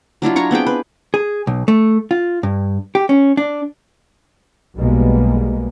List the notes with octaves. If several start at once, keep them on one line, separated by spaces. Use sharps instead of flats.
F#3 D4 E4 F4
D4 C#5 A#5 C#6
B3 C4 G#4 G5
B4
G#4
B1
A3
F4
G2
G4
C#4
D4
B1 B2 G3 G#3 A#3 B3